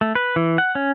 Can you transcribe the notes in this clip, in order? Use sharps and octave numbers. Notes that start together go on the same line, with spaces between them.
A3
B4
E3
F#5
C#4